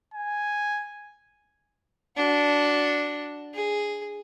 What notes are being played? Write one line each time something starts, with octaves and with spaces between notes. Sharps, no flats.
G#5
D4 F#4
G#4